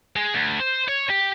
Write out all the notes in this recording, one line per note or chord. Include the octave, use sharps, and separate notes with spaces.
G#3
D2
C5
C#5
G4